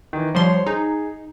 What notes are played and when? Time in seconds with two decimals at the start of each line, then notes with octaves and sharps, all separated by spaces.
0.13 D#3 E3
0.35 F3 G3 C5 C#5 C6
0.66 D#4 G#4